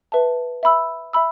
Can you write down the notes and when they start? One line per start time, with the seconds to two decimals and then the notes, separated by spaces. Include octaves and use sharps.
0.12 B4 E5 A5
0.63 E5 B5 E6
1.13 E5 B5 E6